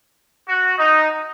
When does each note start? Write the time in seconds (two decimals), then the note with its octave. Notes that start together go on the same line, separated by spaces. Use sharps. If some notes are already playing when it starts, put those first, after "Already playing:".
0.48 F#4
0.78 D#4